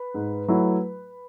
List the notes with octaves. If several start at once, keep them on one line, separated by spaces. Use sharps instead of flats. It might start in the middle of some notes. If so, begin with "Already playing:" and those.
Already playing: B4
G#2
F#3 A3 E4